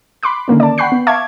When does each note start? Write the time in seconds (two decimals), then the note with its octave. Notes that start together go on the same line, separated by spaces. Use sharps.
0.23 B5 C6 D6 F#6
0.48 D3 D#3 A#3 C#4
0.60 D5 A5
0.78 F#5 G5 B5 C#6 F#6 C7
0.92 B3
1.07 E5 F5 A5 C#6 D6 G#6